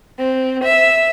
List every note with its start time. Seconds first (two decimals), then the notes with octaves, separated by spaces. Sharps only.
0.18 C4
0.63 E5